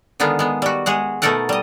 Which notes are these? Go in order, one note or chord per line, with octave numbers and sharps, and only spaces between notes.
D3 D#3 G#3 B3 F4
G#3 B3
G3 F#4
G#3 G#4 F#5
B2 A3 D#4 A4 A#4 F#5
G3 D#5